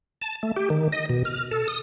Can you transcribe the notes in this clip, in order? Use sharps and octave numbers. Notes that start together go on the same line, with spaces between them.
A5
A3
G4
D#3
D#5
B2
F6
A4
D#6